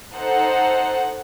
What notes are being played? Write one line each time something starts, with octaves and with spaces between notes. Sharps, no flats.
D#4 A4 C5 F#5